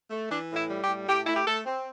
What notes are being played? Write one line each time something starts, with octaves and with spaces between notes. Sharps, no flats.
A3
E3 D4
A2
E4
G3
G4
A2
A2 G4
A3 E4
G4
A3 A4
C4